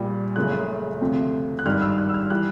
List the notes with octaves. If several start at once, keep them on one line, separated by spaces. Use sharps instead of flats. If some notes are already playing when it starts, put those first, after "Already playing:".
Already playing: A#1 A#2 G3
F#1 F#2 C#3 F3 A3 F#6
D2 C3 F3 A3 C4
F#6
G#1 G2 D#3 G3 F6
E6
F#6
E6
F6
E3 G3 F#6